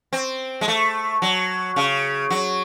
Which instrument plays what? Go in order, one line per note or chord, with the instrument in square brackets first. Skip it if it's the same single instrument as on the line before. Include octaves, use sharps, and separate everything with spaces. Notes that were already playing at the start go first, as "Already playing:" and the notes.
[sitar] C4
G#3
A3
F#3
C#3
F#3